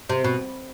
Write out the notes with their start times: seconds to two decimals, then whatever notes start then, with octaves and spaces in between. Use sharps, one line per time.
0.09 C3
0.24 B2